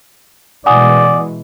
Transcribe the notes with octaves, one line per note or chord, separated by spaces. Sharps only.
B2 E3 G#3 D5 F#5 G#5 D#6